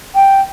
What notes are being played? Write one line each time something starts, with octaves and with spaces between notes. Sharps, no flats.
G5